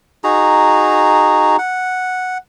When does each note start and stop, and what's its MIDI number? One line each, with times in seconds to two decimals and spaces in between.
0.24 1.56 63
0.24 1.56 66
0.24 1.56 68
0.24 1.56 82
1.58 2.38 78